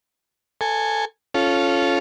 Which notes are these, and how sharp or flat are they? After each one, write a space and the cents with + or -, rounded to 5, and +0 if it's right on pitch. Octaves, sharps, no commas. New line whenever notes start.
A4 +15 G#5 +0
C#4 +0 F4 +0 A4 -20